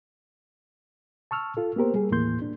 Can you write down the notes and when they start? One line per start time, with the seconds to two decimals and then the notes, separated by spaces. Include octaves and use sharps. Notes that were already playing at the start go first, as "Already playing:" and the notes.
1.31 A5 C#6 E6 F6
1.57 F4 A4
1.76 A#3 B3 G4 A#4 C5
1.94 G3 G#4
2.11 D#2 A2 E3 A#3 C6 G6
2.42 D4